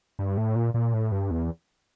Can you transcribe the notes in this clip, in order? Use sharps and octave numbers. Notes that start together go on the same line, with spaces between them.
G2
A2
A#2
A#2
A2
G2
E2